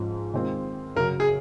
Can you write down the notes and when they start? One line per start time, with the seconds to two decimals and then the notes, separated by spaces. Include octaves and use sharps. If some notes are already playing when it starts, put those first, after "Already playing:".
Already playing: G#2 F3 C#4
0.33 D#3 G#3 C4 F4
0.96 F#2 C#3 F#3 A#4
1.20 G#4